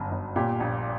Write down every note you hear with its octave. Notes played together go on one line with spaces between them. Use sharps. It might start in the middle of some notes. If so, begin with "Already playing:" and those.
Already playing: G1 F#2
G1
A#2 G4
A#1